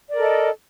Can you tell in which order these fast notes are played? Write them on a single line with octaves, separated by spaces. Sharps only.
D5 A#4 A4 D#5